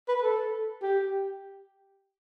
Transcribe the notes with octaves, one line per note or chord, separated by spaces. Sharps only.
B4
A4
G4